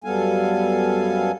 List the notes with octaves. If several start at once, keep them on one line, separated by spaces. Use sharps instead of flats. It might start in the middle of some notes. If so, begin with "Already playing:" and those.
F#2 G3 B3 A4 F5 G#5